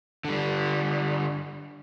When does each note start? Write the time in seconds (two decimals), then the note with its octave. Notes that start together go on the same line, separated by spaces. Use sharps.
0.25 D3 G3